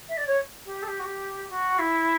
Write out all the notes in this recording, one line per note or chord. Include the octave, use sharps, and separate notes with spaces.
E5
D5
C#5
G4
A4
G4
F#4
G4
F#4
E4